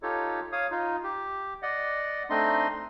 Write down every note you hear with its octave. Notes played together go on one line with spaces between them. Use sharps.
D#4 F4 G4 A4 C#5
C#5 F5 D#6
D#4 F4
G4
D5 D#5 F#5
A3 C4 D4 D#4 D#5 C6